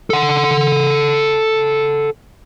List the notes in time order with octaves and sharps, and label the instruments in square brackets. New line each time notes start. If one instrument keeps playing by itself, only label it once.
[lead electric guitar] A4 F#5